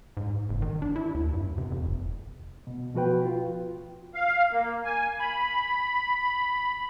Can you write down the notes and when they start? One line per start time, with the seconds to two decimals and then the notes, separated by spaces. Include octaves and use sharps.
0.17 G#2
0.49 F#1
0.62 D#3
0.82 D4
0.96 E4
1.14 D#2
1.34 G2
1.58 C3
1.72 F2
1.86 F1
2.67 B2
2.94 B2 F3 F#4 B4 G5
3.25 F4
4.15 F5
4.52 A#3
4.85 G#5
5.20 B5